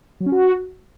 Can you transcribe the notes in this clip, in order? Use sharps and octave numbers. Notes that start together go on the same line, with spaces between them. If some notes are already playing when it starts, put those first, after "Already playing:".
F#3
C#4
F#4